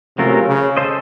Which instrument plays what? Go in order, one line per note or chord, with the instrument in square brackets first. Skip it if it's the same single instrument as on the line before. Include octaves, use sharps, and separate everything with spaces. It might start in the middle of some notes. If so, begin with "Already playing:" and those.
[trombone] C3 [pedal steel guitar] F#3 A3 C#4 F4 A#4
[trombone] C#3
[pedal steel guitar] C#4 A4 C5 D#5